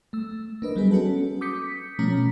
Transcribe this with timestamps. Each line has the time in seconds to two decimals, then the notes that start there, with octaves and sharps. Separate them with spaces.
0.13 A3 E6
0.62 A#3 D4 B4 D#5
0.76 F#3 G3 B3 G#4
0.91 C#4 F#4 A4
1.41 D6 D#6 G6 B6 C#7
1.99 B2 F3 A3 C#4 A#5 B6